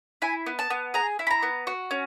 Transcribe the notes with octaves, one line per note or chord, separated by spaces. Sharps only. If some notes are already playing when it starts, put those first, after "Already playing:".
E4 G#5
B3
A5
B3
G#4 A#5
E4
B5
A#5
B3
F#4
C#4